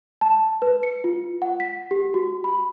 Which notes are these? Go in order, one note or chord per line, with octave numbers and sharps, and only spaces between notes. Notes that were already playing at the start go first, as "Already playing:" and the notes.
A5
B4
C#7
F4
F#5
B6
G4
F#4
B5